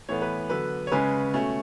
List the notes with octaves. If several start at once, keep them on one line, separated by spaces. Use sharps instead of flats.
A2 E3 B3 C#5
B4
D3 F#3 B3 B4
C#5
C#3 G#3 C#4 B4
B2 A3 C#4